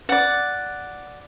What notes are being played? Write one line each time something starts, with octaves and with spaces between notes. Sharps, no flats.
D5 F#5